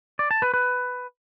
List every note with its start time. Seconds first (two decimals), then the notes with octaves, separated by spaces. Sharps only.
0.19 D5
0.31 A5
0.42 B4
0.54 B4